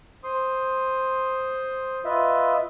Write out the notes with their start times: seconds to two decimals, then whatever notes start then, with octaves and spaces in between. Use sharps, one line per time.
0.24 C5 C6 D#6
2.05 F4 B4 D#5 E5